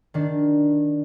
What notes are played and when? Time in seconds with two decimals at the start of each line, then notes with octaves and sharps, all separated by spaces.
0.14 D#3 D4